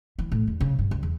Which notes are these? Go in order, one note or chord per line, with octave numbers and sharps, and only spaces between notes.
E3
A2
E2
C#3
G2
C#2
E2